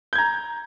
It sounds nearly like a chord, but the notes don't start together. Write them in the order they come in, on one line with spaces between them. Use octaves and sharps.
G6 G#6 A#5